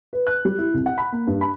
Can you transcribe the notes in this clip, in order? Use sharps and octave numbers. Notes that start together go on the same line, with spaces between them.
B4
F#6
G3
E4
C2
F#5
B5
A#3
G2
B5